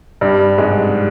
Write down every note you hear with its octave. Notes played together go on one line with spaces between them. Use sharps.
G2 G3
G#2 G#3